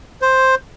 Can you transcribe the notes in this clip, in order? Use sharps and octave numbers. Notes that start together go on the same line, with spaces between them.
C5